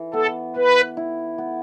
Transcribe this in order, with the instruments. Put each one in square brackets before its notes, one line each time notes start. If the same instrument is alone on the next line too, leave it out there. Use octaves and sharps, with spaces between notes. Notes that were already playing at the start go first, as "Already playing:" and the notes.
Already playing: [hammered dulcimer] E3
[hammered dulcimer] B3 [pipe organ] A4
[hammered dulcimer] B3 [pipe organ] B4
[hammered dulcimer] E4
B3